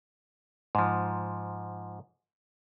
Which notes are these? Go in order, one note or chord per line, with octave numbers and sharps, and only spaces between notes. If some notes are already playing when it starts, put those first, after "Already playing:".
G#2 F3